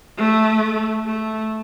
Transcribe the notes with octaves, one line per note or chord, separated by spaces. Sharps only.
A3
A3